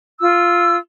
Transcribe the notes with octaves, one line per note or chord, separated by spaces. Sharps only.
F4 E6